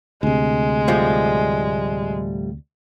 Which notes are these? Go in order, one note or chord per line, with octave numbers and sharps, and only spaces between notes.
D2 C3 G#3
A2 F3 G3